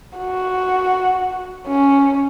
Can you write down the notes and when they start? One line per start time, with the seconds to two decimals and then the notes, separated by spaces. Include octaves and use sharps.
0.18 F#4
1.68 C#4